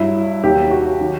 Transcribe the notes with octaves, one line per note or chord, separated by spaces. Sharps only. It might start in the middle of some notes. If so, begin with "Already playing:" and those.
Already playing: G2 F#3 E4
D#2 D#3 F#3 G4
F#4
D#3 F#3